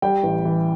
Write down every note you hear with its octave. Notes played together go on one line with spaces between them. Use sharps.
G3 G5
A1
E3